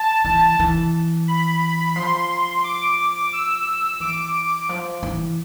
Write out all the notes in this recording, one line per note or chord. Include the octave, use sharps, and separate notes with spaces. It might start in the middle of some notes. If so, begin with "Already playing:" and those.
Already playing: A5
E3
E3
B5
F3 C6
D6
E6
E3 D6
F3
E3